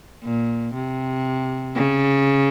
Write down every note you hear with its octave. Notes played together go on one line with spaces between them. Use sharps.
A#2
C3
C#3